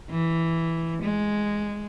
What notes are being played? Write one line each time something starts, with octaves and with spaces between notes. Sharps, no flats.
E3
G#3